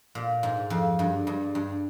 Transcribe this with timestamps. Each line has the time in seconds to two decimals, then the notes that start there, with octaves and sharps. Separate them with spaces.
0.15 A#2
0.43 G#2
0.70 F2
0.99 G2
1.27 G2
1.55 G2